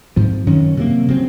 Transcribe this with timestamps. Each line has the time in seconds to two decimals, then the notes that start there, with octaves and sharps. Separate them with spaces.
0.16 G#2 F3 C4
0.46 F#2 D#3 F#3 C#4
0.77 C3 F#3 A#3
1.08 C#3 F#3 C4